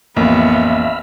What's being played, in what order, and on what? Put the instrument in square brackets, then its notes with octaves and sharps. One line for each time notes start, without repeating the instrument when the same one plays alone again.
[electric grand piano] A1 [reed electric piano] F2 A#3 [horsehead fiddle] B3 [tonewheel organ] E5 F5 B5